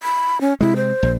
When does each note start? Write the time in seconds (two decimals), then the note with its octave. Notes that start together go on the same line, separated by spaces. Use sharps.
0.03 B5
0.41 C#4
0.61 C3 G#3 E4
0.76 C5
1.03 A#1